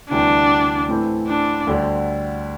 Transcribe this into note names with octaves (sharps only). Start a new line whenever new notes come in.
D2 C3 E3 G3 D4
A2 E3 C4 A4 C5
D4
D2 D3 G3 D4 C5